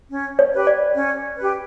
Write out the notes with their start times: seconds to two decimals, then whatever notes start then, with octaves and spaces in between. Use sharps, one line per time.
0.11 C#4
0.39 C#5
0.53 G4 B4
0.67 D5
0.95 C#4
1.37 G4 B4